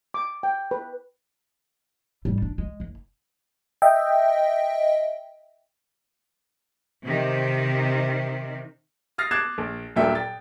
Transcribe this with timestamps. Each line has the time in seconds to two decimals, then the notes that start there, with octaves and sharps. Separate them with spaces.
0.14 D6
0.43 G5
0.71 B4
2.25 G#2 G3
2.42 D4
2.58 G#3
2.80 F#1
3.82 D#5 E5 G5
7.04 C3 D#3
9.18 D#6 F6 A6 A#6 C7
9.31 D6 F#6 G#6 A6 C7 E7
9.58 A#1
9.96 D#1 G2 A#2 F#3 E5 G5
10.15 G5 A6